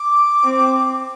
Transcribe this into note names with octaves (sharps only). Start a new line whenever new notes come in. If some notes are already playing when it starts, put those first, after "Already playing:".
Already playing: D6
C4